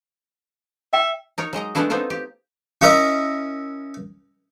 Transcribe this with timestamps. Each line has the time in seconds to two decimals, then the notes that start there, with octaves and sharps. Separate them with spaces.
0.93 E5 G5
1.38 D#4 A#4 C#5
1.53 F#3 G#3 D#5 A#5
1.75 G#3 A3 B3 D4 E4 F#4
1.90 B3 C4 D#4 F4 A4
2.10 G4
2.81 C#4 E4 A#4 D#5